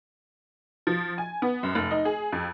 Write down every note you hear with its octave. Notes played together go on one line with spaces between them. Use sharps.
F3
G#5
B3
F#2
F1
D#4
G#4
F2